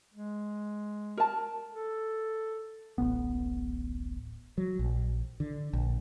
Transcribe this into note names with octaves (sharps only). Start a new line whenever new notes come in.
G#3
A#4 A5
A4
D1 A1 B3
F#3
A#1
D3
A#1